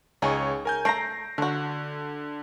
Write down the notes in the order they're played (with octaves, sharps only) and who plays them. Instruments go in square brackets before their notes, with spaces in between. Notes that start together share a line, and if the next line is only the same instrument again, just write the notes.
[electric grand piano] C#2 C#5 C#6 [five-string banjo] D#4 G#4
[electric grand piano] A#4 G#5 G6
[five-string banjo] A3 A#5 [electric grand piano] A#6 C7 D7
[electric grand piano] D3 [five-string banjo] A3 F#4